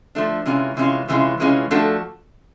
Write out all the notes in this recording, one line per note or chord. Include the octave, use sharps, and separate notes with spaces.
F3 A3 D4
C3 E3 G#3 C#4 F4
C3 E3 G#3 C#4 F4
C3 E3 G#3 C#4 F4
C3 E3 G#3 C#4 F4
F3 A3 D4 F#4 A4